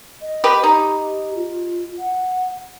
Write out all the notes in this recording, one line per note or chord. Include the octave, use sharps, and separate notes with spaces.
D#5
G4 B4
D#4 G4
F4
F#5